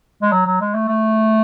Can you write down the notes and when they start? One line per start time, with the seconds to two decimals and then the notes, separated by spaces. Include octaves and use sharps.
0.22 G#3
0.32 F#3
0.46 F#3
0.61 G#3
0.75 A3
0.89 A3